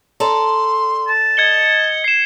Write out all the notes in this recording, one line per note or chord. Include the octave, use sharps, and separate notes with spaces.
A4 D5 A#5 C6
A5
D#5 G#6 C#7 G7
C7 E7